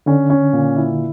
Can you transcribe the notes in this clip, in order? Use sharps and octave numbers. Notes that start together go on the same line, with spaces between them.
D3 C#4
C#4
A#2
E4